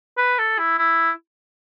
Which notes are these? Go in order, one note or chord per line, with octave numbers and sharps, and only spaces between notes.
B4
A4
E4
E4